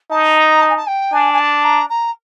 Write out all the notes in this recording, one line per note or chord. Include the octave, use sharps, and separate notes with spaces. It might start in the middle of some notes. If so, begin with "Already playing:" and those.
D#4 A5
A#5
A5
G#5
A5
G5
D4 G#5
G#5
A5
A#5
A#5